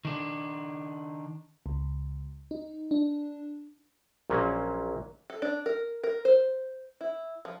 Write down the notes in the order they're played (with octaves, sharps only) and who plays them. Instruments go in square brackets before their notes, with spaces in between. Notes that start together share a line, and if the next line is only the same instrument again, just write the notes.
[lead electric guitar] D#3 D4
[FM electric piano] C#2
D#4
D4
[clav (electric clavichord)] A#1 A#2 F#3 A#3 C#4
[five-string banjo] A4
D4
A#4
A#4
C5
E4
F3